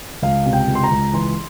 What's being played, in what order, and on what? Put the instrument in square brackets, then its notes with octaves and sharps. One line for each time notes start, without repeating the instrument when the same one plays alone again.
[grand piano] C#2 F5
C3
G5
C#2
C6
A#5
C#2
E3 C6